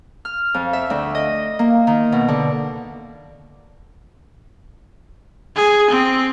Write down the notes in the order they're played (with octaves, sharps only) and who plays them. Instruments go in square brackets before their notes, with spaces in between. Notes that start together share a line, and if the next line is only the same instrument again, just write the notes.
[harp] F6
F2
E5
D2
D#5
A#3
D#3
B2
D3
[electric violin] G#4
C4